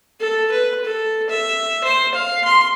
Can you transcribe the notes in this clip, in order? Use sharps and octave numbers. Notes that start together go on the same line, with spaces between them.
A4
B4
A4
E5
C5
F5
C6